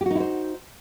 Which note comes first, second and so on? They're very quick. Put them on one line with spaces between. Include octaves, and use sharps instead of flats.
G4 F#4 D#4 E4 C5